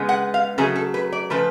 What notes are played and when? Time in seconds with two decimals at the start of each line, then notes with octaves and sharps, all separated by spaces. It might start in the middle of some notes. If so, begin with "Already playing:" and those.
Already playing: C#3 G#3 B3
0.09 F#5
0.34 F5
0.58 C#3 F#3 A3 G#4
0.76 A4
0.94 B4
1.12 D5
1.30 C#3 F3 A3 B4